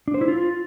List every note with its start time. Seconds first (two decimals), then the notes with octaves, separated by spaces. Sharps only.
0.08 D4
0.14 C5
0.21 E4
0.28 F4